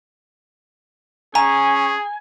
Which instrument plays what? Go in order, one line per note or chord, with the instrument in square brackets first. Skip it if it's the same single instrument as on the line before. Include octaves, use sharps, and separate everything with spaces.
[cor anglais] C#4 [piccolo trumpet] G#4 [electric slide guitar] G#5 [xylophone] A#5